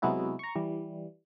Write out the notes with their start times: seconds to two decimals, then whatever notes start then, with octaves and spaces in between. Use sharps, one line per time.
0.02 C3 F#3 G#3 B3 E4 F#4
0.39 A#5 C#6
0.55 E3 G3